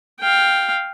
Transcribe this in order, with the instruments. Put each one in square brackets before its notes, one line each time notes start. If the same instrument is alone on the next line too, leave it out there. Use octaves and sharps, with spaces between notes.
[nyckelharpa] F5 G5